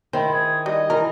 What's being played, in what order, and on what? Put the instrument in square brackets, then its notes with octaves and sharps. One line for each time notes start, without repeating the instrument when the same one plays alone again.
[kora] D#3 E4 [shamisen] C5
[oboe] G#4
[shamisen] G3 [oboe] D#5
[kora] E3 [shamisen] A#4